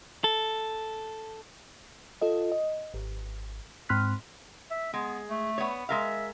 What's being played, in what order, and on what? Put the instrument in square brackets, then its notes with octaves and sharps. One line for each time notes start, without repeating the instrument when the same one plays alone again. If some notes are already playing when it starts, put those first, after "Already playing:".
[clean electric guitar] A4
[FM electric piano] F4 A4 D#5
D#5
G#1
G#2 C4 C6 F6 F#6 B6
[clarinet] E5
[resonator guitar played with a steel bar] G#3 [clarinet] B3
[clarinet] A3
[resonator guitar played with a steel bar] B3 C#5
[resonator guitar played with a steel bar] G#3 A#4 F5 [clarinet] E5